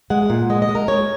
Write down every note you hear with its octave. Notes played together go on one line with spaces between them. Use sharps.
G#3 F#5
A#2
G#3 D#5
D#5
G#3
A#4
G#3 C#5